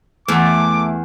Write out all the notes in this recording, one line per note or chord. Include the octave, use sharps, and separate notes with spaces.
E2 A3 D6